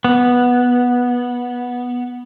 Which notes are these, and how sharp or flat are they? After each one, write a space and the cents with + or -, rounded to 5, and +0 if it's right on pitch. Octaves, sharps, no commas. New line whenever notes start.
B3 -10